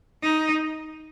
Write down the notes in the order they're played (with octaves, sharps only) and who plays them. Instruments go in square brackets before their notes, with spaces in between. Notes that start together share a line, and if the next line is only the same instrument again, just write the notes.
[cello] D#4